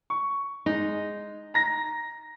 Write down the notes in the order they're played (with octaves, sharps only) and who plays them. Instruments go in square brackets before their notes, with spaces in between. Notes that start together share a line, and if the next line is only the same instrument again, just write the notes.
[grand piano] C#6
[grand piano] G#3 [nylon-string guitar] D#4
[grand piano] A#5 A#6